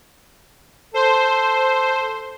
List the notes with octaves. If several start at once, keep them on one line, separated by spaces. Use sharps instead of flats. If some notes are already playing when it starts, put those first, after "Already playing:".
A4 C5